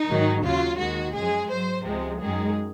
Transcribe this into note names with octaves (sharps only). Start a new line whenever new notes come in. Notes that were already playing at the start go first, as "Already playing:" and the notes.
Already playing: D#4
G#2 D#3 F#3
D#2 C#3 F#3 F4
D#2 D#3 G#3 F#4
F#2 F3 G#3 G#4
G#2 F#3 C5
C#2 C3 F3 G#3
F#2 D#3 G#3 G#4